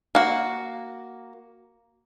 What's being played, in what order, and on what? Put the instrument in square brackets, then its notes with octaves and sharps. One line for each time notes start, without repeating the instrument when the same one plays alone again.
[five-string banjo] A#3 F#4